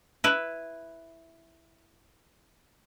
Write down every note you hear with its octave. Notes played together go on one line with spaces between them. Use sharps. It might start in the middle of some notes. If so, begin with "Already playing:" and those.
E4 B4